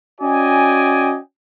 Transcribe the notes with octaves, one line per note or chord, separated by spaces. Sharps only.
C#4 F#4 D5 D#5 G5 G#5